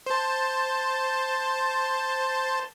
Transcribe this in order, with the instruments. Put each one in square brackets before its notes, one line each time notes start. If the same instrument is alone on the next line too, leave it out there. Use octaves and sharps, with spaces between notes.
[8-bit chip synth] C5 A5